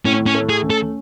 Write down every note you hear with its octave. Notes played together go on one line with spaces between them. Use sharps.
A2 C#4
C#4
A3
G#4
C#4
A4